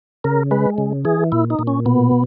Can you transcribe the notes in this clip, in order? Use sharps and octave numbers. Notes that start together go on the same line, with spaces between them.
C#3 A#4
G#3 B4
C#3
E3 G#4
A#2 E4
D#4
A#2
C#4
B2 B3